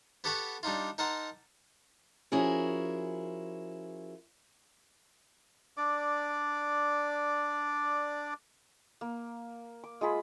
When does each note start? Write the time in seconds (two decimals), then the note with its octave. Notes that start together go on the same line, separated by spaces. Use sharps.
0.24 B3 G4 A4 F#5 B5 C#6
0.63 G3 D4 D#4 F4
0.98 D#4 A#4 F#5 A5 C6
2.32 F3 C#4 E4 F#4 G#4 A#4
5.77 D4 D5 D6
9.01 A#3
9.84 D6
10.01 G#3 F4 G#4 B5